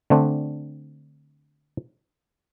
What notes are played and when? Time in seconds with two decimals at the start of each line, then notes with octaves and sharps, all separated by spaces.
0.10 D3 A3 C4 D4